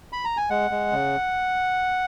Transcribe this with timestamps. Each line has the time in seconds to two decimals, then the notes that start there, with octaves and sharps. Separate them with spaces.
0.13 B5
0.25 A#5
0.37 G#5
0.50 G#3 F#5
0.71 G#3
0.92 C#3